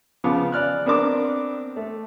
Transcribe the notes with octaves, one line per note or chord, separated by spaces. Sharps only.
C#3 F3 B3 F5 D6
D5 F6 F#6
B3 C4 D4 A#4 D6
A3